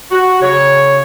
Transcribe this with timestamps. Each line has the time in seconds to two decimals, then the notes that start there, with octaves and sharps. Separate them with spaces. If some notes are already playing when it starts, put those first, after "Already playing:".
0.11 F#4
0.42 C#3 C#5